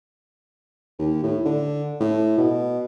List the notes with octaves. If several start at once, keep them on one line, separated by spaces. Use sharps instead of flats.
D#2
A2
D3
A2
B2